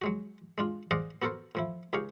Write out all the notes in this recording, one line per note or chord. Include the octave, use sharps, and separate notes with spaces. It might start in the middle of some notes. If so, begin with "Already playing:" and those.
F#3 G#3 F#4
G#3 D4 F4
G#4 C5 D5 D#5 F5 F#5
B3 F#4 A4 A#4 C5
A2 F3 E4
C#2 D#4 G4 G#4 C#5 F5